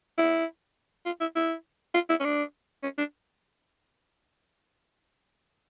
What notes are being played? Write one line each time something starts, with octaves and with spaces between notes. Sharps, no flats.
E4
F4
E4
E4
F4
E4
C#4
D4
C#4
D4